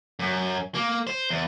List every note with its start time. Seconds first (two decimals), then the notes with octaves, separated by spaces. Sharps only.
0.19 F#2
0.75 A#3
1.07 C5
1.30 E2